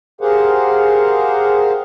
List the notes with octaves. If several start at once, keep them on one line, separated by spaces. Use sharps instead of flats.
G4 G#4 A#4 C5 F5 F#5